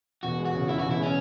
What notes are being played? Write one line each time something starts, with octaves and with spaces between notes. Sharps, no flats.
E1 F#4
G#3
F#4
C#3
E2 E4
E1 F#4
E4
G#3 C#4